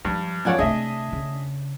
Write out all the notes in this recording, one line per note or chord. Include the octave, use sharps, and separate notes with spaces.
G2 F3
F#2 F3 C#5 D5 F#5 G#5
C3 A3 D4 G#4 D#5 E5
C#3